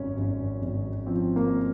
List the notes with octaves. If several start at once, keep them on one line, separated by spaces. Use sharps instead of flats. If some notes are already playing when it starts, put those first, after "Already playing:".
Already playing: G#1 F#2 C#4
G#1
G#1
F3 C4
A#3